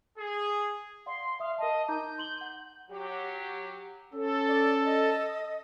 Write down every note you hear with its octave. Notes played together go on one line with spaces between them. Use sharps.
G#4
D5 F5 F#5 C6
E5 F5 D#6
A#4 D#5 A5
D#4 A#5 D6 G6
C6 F#7 G7
F#5
F#3 G4
C#4 A4
D5
D#5